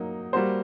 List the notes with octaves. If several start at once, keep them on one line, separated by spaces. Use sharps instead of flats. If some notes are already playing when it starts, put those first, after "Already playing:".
Already playing: F#3 A#3 D#4
G3 A#3 F#4 C5